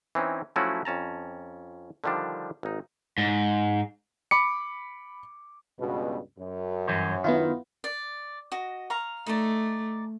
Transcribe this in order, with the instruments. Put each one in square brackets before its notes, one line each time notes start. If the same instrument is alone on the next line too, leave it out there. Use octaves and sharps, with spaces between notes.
[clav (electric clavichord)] E3 C4 C#4 D#4
F3 F#3 A3 C#4 E4 F#4
F2 C#4 A5 A#5
D3 D#3 F3 G3 D4
G#1 D#4
[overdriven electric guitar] G#2
[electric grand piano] B5 D6 C#7
[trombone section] C#2 G2 B2
F#2
[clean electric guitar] G2 E3 C5
[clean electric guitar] D#3 [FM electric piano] B3 E4 F4
[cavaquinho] D5
F#4 D#5
F5 A#5 C#6
[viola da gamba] A3 [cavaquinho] D#4 A4 D5